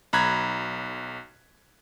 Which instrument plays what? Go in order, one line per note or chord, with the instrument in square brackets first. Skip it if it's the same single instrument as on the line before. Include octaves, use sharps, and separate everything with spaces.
[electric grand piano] B1 A#5 B5 F#6 G#6